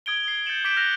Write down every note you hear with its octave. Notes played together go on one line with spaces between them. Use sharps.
D#6 G#6 D7 G7
C7
G6 A6 C#7 E7 F#7
D6 G6 B6 D7 E7
F6 F#6 A#6 F7